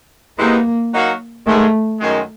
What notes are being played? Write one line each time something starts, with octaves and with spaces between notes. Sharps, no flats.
C3 E3 G#3 A#3 B3 D#4
F#3 A#3 D#4 F#4
G#2 D#3 G#3 A3
F#2 D#3 G#3